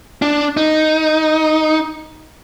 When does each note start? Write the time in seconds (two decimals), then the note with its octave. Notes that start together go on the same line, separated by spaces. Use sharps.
0.22 D4
0.57 D#4